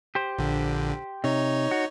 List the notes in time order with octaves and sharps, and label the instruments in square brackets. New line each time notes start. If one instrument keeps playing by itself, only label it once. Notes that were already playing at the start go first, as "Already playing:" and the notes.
[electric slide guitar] G4 C5
[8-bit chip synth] A#1 D3
[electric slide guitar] C3 [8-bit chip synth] D#4 C#5
[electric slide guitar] F#4